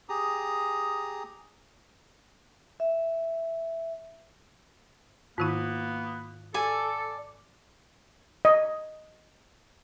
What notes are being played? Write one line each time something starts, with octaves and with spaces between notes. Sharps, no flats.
G4 G#4 A#5 D#6
E5
G#2 D#3 A#3 B3 E4
A4 D5 G#5
D#5